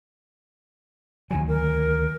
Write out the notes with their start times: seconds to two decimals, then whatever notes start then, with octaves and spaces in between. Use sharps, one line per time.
1.31 D2 D#3 F#3 G#5
1.48 A#4